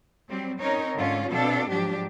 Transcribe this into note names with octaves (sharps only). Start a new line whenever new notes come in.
F#3 G3 C4
C4 C#4 D#4 A#4 C#5
G#2 D3 C#4 F4 C#5
B2 C4 D4 A4 F5
G#2 F3 F#3 D4 G4